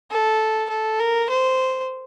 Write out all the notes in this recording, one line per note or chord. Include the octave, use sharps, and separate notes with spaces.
A4
A4
A#4
C5